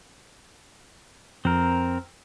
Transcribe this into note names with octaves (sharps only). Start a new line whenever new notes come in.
F2 C4 A#4